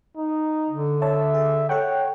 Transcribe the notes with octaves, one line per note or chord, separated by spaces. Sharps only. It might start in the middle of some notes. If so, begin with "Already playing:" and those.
D#4
D3
C#5 E5 A5
G#4
A4 C#5 F#5 G5